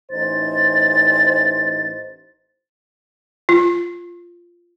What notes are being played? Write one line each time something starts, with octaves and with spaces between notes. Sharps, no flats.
A1 D#4 C5 A6
F4